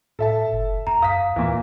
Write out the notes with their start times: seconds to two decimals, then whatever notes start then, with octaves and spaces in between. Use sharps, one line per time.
0.19 A2 A4 E5 A5
0.53 F#1
0.87 F2 A#5
1.02 F#2 F5 D#6 B6
1.36 D#2 A#2 E3